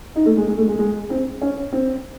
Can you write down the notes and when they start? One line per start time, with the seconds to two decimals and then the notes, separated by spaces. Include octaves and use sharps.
0.16 D#4
0.26 A3
0.37 G#3
0.47 G#3
0.58 A3
0.68 G#3
0.79 G#3
1.10 C4
1.42 C#4
1.72 C4